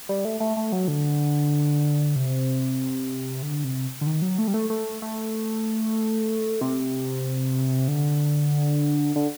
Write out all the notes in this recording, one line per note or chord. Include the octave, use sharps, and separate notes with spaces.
G3
A3
A3
A3
F#3
D3
C3
D3
C3
D3
D#3
F#3
A3
G3
A3
A3
A3
C3
D3
D3